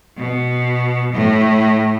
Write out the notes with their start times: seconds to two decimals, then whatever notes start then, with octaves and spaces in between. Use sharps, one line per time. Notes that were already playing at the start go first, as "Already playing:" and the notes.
0.16 B2
1.13 A2